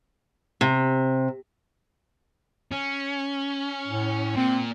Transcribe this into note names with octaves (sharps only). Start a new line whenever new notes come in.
C3
C#4
A2
A#2 C4